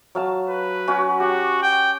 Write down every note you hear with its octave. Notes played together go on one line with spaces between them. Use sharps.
F#3 F5 A5
B4
C#4 F#4
F#4 G4
G5